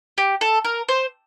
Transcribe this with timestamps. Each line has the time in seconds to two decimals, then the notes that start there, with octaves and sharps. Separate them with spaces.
0.18 G4
0.41 A4
0.65 A#4
0.89 C5